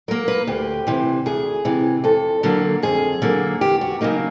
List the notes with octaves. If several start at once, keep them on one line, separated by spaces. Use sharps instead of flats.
F#3 A#3 A#4
B4
D2 G4
C3 E3
D2 G#4
C3 E3
F2 A4
D3 F#3 A#3
F2 G#4
D3 F#3 A#3
E2 G4
F#4
C#3 F#3 A#3 D#4